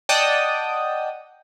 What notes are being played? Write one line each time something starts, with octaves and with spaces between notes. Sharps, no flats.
D5 D#5 F#5 G5 A5 D#6